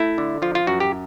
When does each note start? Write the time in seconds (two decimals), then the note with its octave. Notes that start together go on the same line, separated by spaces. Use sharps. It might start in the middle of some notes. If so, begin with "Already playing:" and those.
Already playing: A3 E4
0.18 D3
0.42 F3 F4
0.55 F4
0.67 F#2 F#4
0.80 G4